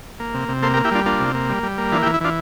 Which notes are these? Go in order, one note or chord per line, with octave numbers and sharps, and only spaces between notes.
A#3
C3
C3
A#3 A4 C5
G4 A#4
A#3
E4 G4
G3 D4 F4
A#3 D4 F4
C3
A#3
G3
G3
A#3
E3 D4 F4
E4 G4
E3
E4
E3 D4 F4